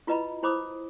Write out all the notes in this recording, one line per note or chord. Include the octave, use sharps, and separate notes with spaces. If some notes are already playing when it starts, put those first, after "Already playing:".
E4 F4 B4 D#5 A#5 B5
E4 C5 B5 D6 D#6